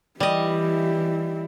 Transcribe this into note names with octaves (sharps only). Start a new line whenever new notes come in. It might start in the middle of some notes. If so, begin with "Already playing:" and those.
E3 G3 E4 G4 D#5